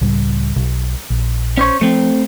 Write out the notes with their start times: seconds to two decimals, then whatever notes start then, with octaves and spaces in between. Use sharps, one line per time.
0.01 C#2 A2 G3
0.56 B1
1.10 A#1
1.58 C#4 C5 C#5
1.81 F3 A3 C4